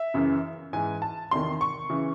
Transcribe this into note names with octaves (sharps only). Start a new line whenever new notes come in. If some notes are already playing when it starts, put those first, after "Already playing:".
Already playing: E5
F#2 C#3 E3
G#2 E3 G#5
A5
E2 C3 D#3 C6
C#6
C#3 E3